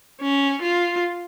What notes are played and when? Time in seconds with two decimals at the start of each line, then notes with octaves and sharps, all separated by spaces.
0.21 C#4
0.62 F4